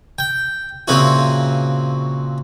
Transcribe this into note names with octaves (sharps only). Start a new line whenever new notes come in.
G5
A#2 C#3 C4 E4 F#4